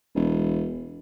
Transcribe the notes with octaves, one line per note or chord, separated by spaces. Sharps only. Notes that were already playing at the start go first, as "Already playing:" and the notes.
E1